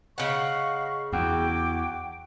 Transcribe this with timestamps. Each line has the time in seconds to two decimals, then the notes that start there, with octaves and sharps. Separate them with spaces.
0.18 C#3 D#5 F5 F#5 C#6
1.12 E2 F#4 G5 D6